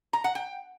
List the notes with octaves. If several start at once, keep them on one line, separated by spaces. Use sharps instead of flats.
A#5
F#5
G5